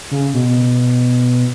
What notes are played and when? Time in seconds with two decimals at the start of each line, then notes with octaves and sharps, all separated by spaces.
0.11 C#3
0.34 B2